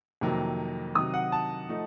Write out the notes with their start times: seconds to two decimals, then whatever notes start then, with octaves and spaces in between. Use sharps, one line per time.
0.21 F2 C3 D#3 F#3 A#3
0.95 C3 D#3 F#3 D#6
1.14 F#5
1.32 A5
1.69 F3 A3 D#4